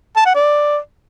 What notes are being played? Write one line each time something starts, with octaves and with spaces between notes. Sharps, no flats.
A5
F#5
D5